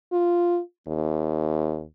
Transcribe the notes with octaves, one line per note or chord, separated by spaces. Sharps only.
F4
D#2